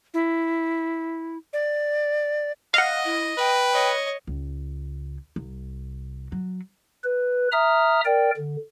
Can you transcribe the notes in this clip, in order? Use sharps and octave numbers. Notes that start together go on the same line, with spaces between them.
E4
D5
D#5 F5 F#5
E4
B4 G5
C#5 D#5
C#2
C2
F#3
B4
E5 A#5 D#6 F6
A#4 D5 G5
D3